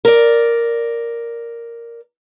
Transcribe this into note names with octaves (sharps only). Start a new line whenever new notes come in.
A#4 D5